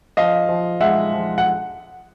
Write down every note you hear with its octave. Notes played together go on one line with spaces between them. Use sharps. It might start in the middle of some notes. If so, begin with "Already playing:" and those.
F3 D#5 F5
F3
G#3 E5 F#5
F3
F#5